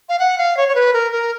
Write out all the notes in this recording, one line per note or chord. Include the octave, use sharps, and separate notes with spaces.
F5
F#5
F5
C#5
C#5
B4
A#4
A#4